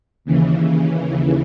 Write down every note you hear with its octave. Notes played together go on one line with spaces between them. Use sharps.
D#2 C#3 E3